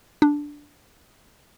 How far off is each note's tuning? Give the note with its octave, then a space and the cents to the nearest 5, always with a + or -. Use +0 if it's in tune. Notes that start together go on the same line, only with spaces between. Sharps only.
D4 -5